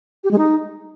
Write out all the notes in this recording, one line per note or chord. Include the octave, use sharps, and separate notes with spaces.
G4
G#3
D#4